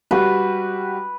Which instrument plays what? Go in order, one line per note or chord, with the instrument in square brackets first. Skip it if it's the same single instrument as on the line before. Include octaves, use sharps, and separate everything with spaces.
[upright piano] G3 F#4 [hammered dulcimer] B4